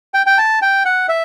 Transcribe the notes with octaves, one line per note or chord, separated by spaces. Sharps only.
G5
G5
A5
G5
F#5
E5